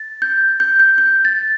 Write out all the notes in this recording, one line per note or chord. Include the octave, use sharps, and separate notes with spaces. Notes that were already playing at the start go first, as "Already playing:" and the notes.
Already playing: A6
G6
G6
G6
G6
A6